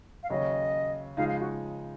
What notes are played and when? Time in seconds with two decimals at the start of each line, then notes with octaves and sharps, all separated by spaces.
0.23 F5
0.30 D#2 C#3 F#3 C#4 D#5
1.17 C#3 F3 G#3 D#4 F5
1.28 F5
1.40 F#4